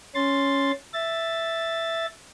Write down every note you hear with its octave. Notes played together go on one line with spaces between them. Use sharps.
C#4 C6 A6
E5 A6